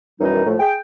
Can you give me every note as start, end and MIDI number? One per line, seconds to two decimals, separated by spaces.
0.21 0.45 42
0.21 0.45 47
0.21 0.45 51
0.21 0.45 52
0.21 0.45 55
0.21 0.45 63
0.46 0.55 45
0.46 0.55 53
0.46 0.55 57
0.60 0.76 68
0.60 0.76 79